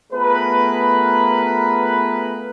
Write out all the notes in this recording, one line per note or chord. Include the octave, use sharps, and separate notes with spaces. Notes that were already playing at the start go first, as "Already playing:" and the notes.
A3 B3 F4 G#4 A#4 B4